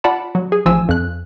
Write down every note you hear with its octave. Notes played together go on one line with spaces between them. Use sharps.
F4 D5 F#5 A5 B5
F#3
G#4
A1 F3 F4 G#5 E6
F2 F#6